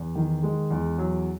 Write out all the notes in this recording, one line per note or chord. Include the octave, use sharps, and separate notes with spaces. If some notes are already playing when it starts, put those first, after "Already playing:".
Already playing: E2
D#3
G#3
E2
F#3